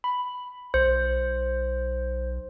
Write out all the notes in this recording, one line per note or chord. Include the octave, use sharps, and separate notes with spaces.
B5
B1 C5